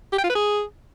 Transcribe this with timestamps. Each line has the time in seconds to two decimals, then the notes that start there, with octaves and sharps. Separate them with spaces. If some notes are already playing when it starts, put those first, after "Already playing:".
0.13 G4
0.18 G5
0.24 F4
0.30 B4
0.35 G#4